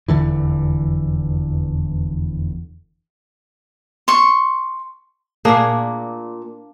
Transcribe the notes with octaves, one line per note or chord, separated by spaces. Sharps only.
F1 E2 D3 E3
C6 C#6
A#2 A#3 D4 G#4